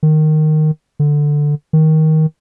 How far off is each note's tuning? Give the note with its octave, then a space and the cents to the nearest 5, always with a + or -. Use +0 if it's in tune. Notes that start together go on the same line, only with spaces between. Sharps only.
D#3 -10
D3 +5
D#3 +15